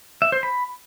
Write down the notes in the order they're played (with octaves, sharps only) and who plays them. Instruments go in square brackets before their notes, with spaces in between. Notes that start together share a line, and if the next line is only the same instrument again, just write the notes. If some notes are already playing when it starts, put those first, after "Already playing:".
[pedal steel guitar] E5
C5
B5